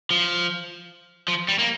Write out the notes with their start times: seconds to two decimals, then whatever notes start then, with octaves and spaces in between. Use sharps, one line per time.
0.11 F3
1.28 F3
1.48 G3
1.59 A#3